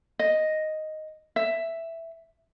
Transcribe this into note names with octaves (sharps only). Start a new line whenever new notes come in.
D#5
E5